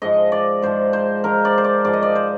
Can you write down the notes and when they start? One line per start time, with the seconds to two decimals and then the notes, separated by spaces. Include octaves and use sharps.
0.02 G#2 F3 D#5
0.32 D5
0.62 G#2 F3 C5
0.93 C5
1.24 G#2 F3 A#4
1.45 D5
1.58 C5
1.64 D5
1.85 G#2 F3 D5
1.93 D#5
2.02 D5
2.15 C5